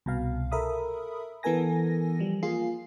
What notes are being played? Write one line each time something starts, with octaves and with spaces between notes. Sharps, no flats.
C2 B2 F5
A4 A#4 E5 B5 D#6
E3 B3 A4 A#4 G#5 A#6
F3 G3
A#3 F4 G#4 C7